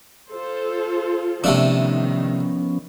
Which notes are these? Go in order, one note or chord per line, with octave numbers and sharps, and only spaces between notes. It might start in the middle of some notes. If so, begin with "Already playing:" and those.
F4 A4 C5
C3 D#3 F3 A3 B3 C#4 D4